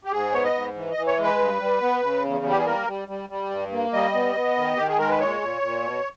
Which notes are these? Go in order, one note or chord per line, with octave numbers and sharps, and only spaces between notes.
G4
G#2 G#4
B3 C#5
D#5
G#2
E3
D#5
E3
C#5
G#3
B4
G2
G3
B3
C#3
E2
G3
G4
G#4
A#3 A#4
G3
G3
G3
G2
A#3
G3 D#5
B3
B3
D#3
D#3 G4
G#4
G#3 A#4
B4
A#2 C#5
A#2
A#2
B2